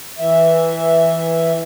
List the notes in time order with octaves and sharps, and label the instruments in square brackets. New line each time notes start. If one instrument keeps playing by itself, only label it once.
[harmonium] E3 E5